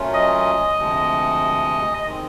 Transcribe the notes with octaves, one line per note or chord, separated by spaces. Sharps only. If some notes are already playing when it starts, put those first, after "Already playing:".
Already playing: A#2 F#3 A3 C#4 F4
D#5
D2 C3 F3 G#3
D#3 G#3 C4